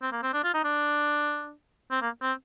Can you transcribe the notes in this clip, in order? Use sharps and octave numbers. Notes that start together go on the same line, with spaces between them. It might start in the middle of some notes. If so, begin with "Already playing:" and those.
C4
A#3
C4
D4
F4
D#4
D4
C4
A#3
C4